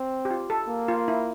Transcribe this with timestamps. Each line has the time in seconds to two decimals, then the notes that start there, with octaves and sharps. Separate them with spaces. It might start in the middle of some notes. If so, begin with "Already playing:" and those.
Already playing: C4
0.25 G4
0.31 F4
0.50 A4
0.69 A#3
0.88 F4
1.08 E4